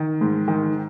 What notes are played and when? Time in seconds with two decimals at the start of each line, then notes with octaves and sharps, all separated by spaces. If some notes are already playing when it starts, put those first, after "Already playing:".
Already playing: D#3
0.21 G#2
0.48 D#3